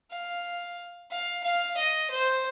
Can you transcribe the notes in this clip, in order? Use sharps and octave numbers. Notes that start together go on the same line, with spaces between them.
F5
F5
F5
D#5
C5